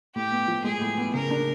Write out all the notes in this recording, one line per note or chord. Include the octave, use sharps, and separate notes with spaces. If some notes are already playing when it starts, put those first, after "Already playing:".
A2 G4
B3
F3
G#3 G#4
A2
B3
C#3 A#4
D4